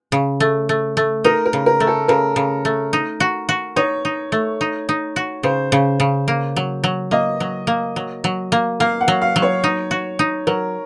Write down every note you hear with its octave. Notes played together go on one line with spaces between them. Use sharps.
C#3
A3
A3
A3
D#4 A#4
A#4
C#3
A#4
A3
A4
C#3 A#4
C#3
A3
D#4
F#4
F#4
D#4 C#5
D#4
A3
D#4
D#4
F#4
C#3 C5
C#3
C#3
A#3
F#3
F#3
A#3 D#5
F#3
A#3
F#3
F#3
A#3
A#3 F5
F#5
F#3
F5
F#3
C#5
D#4
F#4
D#4
F#3 A#4